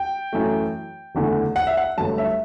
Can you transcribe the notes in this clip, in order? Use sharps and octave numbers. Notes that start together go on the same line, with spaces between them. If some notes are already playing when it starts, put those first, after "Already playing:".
Already playing: G5
F#2 E3 A3
F#1 E2 D3 A3
F#5
E5
F#5
G1 G2 F#3 A3 A5
E5